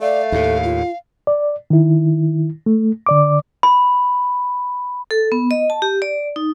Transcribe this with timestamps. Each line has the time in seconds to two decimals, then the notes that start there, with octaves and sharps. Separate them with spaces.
0.01 A3 D5 F5
0.32 D#2 A2 A4
0.64 F4
1.27 D5
1.70 D#3 E4
2.66 A3
3.06 D3 D5 D6
3.63 B5
5.11 A4
5.32 B3
5.51 D#5
5.70 A5
5.82 G4
6.02 D5
6.36 D#4